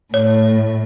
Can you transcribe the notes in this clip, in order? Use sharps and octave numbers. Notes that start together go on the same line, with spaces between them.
A2 C#5